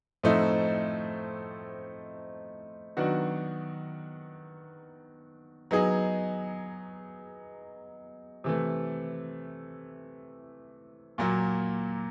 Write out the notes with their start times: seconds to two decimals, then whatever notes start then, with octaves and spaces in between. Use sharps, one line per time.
0.23 A2 F3 A3 C4 D#4
2.97 D#3 F#3 B3 D4 F#4
5.71 F#3 B3 D#4 G#4
8.44 C3 E3 A3
11.18 A#2 F#3 A#3